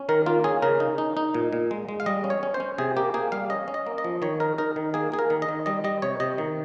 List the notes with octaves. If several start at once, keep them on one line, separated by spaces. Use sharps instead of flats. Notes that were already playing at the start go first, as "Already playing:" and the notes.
Already playing: C#4
D#3 A#4
A#3 F4
C#4 G#4
C#3 A#4
D#4
D#4
D#4
A#2
A#2
G#3
G#3
F5
G3 D#5
C#4
C#5
C#4
C5
C#4
C3 G#4
A#3 G4
A#3 G#4
G3 F5
C#4 D#5
C#4
D#5
A#3
D#5
F3
D#3 C#5
D#4 A#4
D#4 A#4
D#3
A#3 G#4
A#3 G#4
A#4
D#3
D#5
D#3
G3 D#5
G3 D#5
C3 C#5
C3 D#5
D#3